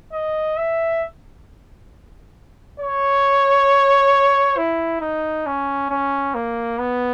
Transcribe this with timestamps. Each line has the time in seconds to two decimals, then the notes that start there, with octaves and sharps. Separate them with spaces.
0.12 D#5
0.57 E5
2.80 C#5
4.57 E4
5.01 D#4
5.46 C#4
5.90 C#4
6.34 A#3
6.79 B3